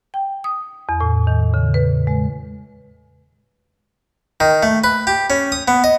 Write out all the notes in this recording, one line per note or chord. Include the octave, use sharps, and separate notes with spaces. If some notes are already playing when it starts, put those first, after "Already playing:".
G5
D#6
E2
A2
D#3
C#3
B4
G#3
D#3
A3
B4
G4
C#4
D#6
B3
D#5